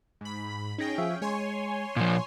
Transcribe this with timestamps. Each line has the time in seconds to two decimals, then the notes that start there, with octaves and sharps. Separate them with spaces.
0.21 G#2 B5
0.78 C#4 D#4 G#4 G5 A#6
0.98 F3 E5 F5
1.22 G#3 C#5 G#5 C6
1.96 A#2 F3